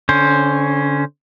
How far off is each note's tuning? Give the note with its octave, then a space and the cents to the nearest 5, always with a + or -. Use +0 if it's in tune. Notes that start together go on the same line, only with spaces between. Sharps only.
D3 -25 C#4 -5 C5 +0